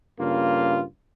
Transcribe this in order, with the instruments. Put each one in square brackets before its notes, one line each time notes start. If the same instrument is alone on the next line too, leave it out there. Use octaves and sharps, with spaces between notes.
[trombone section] G2 C#3 A#3 F4